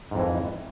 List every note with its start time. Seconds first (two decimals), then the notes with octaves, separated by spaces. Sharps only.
0.11 G#2
0.15 F2
0.19 E3